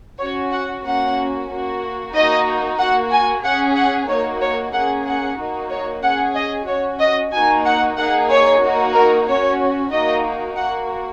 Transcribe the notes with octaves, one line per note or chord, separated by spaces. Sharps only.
C#4 F#4 C#5
F#5
A#3 C#4 F#4 F#5
A#3 F#4
A#3 D#4 F#4 D#5
A#3 F#4 F#5
G#5
C#4 G#4 F#5
F#5
A#3 D#4 F#4 C#5
C#5
A#3 C#4 G#4 F#5
F#5
A#3 D#4 F#4
C#5
C#4 G#4 F#5
D#5
C#4 F#4 C#5
D#5
A#3 D#4 F#4 G#5
F#5
A#3 D#4 G#4 F#5
C#5
A#3 D#4 F#4
A#4
C#4 F#4 C#5
A#3 D#4 F#4 D#5
A#3 F#4 F#5